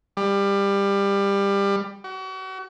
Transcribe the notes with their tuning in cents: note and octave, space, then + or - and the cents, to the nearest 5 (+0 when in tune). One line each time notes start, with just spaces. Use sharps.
G3 +20
F#4 +35